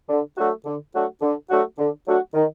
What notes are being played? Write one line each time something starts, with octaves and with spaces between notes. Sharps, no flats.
D3
F#3 A3 D4 F#4
D3
F#3 A3 D4 F#4
D3
F#3 A3 D4 F#4
D3
F#3 A3 D4 F#4
D#3